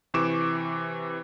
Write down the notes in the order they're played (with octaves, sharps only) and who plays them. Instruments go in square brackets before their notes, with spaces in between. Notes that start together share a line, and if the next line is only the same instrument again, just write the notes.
[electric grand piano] C3 E3 C#6 D6 E7